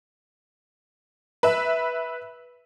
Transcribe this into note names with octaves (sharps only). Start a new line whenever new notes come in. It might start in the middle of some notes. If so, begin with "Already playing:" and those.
B4 E5